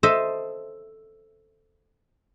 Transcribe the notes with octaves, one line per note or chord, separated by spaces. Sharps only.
A4 C5 D#5 E5